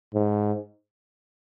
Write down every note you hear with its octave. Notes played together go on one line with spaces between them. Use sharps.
G#2